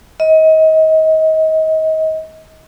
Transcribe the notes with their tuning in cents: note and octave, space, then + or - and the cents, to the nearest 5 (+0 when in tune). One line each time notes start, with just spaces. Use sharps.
D#5 +30